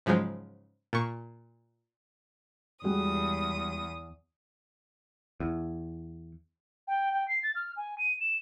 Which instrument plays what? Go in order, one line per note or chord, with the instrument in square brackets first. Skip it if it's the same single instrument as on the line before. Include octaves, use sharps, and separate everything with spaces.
[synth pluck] G#2 C#3 F3 F#3 G#3
A#2 C#6
[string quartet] E2 D#6 [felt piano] G3 G#3 F#4
[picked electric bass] E2
[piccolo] G5
G5
C7
A6
F6
G#5
D#7
E7